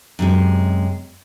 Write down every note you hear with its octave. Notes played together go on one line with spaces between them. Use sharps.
F#2 C3 G#3